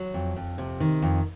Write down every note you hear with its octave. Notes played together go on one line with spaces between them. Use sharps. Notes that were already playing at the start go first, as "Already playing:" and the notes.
Already playing: F#3
F2
F2
C3
D#3
F2